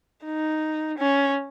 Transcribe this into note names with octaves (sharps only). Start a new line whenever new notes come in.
D#4
C#4